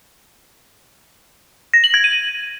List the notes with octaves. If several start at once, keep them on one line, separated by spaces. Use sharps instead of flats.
A#6
F#7
G#6
D#7